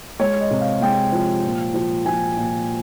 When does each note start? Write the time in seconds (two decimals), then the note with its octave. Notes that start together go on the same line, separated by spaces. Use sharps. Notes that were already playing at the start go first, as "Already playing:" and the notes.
0.19 G#3 C#5
0.41 D#5
0.51 C3
0.61 F5
0.81 G#3 G5
1.12 F3
1.44 A#2
1.74 F3
2.06 F3 G#5
2.37 A#2